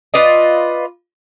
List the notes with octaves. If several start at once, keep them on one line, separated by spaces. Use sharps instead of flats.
F4 B4 D5 D#5